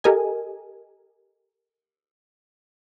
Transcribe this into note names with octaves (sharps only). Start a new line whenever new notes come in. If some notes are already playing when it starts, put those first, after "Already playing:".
G4 A4 A#4 D#5 G#5